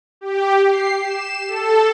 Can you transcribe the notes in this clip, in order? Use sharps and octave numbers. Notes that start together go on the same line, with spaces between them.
G4
C7
E7
A4